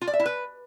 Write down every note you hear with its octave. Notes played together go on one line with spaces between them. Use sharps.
F4
D5
E5
E4
B4